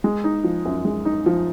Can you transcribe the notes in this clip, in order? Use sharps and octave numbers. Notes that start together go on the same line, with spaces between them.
G#3
D#4
F3
F#2
G#3
D#4
F3